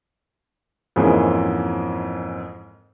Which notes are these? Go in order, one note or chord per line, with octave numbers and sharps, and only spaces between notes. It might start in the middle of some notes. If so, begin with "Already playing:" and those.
F2 G#2 E3 G#3 A#3 C#4